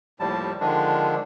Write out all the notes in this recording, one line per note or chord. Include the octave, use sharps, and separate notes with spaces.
D#2 A2 F3 G3 A5
D3 D#3 F3 G#3 D4